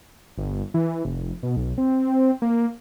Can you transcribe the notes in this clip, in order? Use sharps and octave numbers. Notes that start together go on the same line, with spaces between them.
G1
E3
F1
B2
B1
C4
A#3